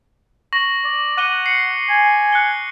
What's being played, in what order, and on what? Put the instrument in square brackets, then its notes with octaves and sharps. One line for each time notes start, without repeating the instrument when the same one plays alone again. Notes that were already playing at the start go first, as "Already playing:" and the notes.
[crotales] C#6 A#6 F#7
[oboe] D5
[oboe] F#5 [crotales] D6 D#7 G7
[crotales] C7 C#7
[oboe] G#5
[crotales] F#6 C#7 G7